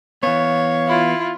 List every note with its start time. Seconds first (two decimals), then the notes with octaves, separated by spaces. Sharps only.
0.23 E3 B3 C#5 F5
0.88 E4 F4